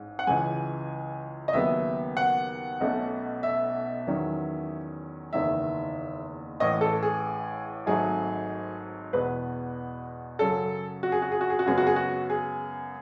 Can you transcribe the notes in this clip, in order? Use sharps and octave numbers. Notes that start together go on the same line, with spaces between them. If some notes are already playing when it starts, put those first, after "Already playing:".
Already playing: A1 G#2
F#5
C#2 C#3 E3 G#3 G#5
D#5
D#2 C#3 F#3 B3 E5
F#5
B1 B2 A3 C#4
E5
E2 D#3 F#3 C#4
F#1 E2 D#3 E5
A1 A2 E3 D#5
A4
G#4
G#1 G#2 F#3 A3 G#4
E2 B2 G#3 B4
F#2 C#3 F#3 C#4 A4
F#4
G#4
F#4
G#4
F#4
G#4
F#4
F#2 C#3 G#3 B3 G#4
F#4
G#4
F#4
G#4